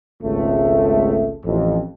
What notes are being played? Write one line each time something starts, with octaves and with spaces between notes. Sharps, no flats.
G#1 C#2 A3
A1 F2